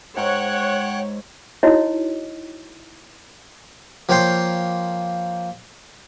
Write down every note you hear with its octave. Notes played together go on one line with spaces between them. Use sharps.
G#2 C#5 F#5 G5 A#5 F#6
D#4 E4 F#4 C#5 D#5
F3 A#3 C#5 G5 C6